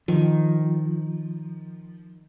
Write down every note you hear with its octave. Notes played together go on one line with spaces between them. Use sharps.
D#3 F3